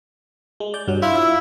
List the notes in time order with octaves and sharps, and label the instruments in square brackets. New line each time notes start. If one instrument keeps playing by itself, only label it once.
[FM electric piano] G#3
D5 G6
G2 F#3
[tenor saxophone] E4 [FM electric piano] F4
[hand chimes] E6